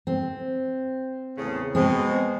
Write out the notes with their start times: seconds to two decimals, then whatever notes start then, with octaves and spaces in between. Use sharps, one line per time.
0.07 C4
1.36 E2 A2 C#3
1.75 B2 G#3 C4